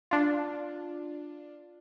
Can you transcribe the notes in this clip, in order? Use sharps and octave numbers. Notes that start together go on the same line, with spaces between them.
D4 F4